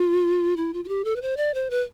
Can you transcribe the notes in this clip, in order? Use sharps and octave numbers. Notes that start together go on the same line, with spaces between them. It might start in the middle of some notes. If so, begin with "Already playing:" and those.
Already playing: F4
E4
F4
F4
G4
A4
B4
C5
D5
C5
B4